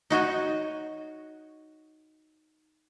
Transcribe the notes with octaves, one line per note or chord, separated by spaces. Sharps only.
D#4 F#4 C#5 D#5